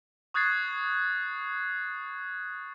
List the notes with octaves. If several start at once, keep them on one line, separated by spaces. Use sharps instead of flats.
C#6 D#6 F#6 G#6 A6 C7